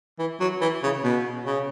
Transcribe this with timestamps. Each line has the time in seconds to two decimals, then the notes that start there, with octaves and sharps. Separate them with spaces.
0.19 E3
0.40 F#3
0.61 E3
0.83 C#3
1.04 B2
1.46 C#3